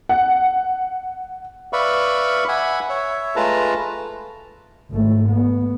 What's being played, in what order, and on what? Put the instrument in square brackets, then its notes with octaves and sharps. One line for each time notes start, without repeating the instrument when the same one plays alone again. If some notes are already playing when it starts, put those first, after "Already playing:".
[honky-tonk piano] F#5
[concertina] B4 D5 E5 F5 B5 C#6
E5 F#5 G#5 B5
C#5 E5
G#3 A3 F4 B4 A5 A#5
[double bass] G#1 A3
B3